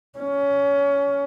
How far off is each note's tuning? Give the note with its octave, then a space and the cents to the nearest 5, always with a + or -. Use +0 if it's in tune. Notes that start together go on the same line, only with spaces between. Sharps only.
C#4 +20